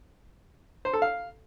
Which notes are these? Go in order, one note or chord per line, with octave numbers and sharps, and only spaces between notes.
C5
A4
F5